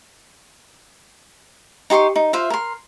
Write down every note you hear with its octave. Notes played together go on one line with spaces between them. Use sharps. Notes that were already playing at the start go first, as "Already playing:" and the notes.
D#4 G4 C6 C#6
D#4
F4 C5 E5
A#4 C6